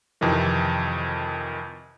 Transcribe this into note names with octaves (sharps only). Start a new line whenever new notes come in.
F2 C3 D#3 E3